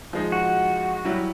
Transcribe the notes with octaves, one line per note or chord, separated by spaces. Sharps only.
F3 G#3 D#4
F#4
F#3 G3 E4